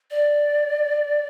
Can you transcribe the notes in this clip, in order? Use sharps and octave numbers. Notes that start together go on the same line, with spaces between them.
D5